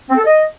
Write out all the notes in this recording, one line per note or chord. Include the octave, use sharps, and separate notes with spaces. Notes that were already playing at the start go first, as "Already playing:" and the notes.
C4
A4
D#5